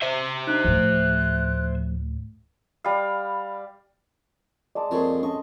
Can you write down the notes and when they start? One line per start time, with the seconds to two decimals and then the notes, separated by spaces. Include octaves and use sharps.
0.02 C5 E5
0.47 D4 D#4 F#6
0.64 D2 A2 F3 A3
2.84 G3 F5
4.75 G#3 D5 A5 D6
4.91 F2 G3 A#3 G#4 C5 C#5
5.23 C#4 A4 D#5 C#6 D#6